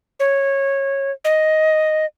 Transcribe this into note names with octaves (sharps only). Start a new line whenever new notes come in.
C#5
D#5